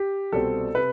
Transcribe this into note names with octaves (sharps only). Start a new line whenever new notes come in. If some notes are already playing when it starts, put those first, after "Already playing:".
Already playing: G4
C2 B2 G3 C4 A4
C3 B4